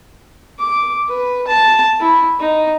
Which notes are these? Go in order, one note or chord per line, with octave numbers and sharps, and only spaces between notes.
D6
B4
A5
E4
D#4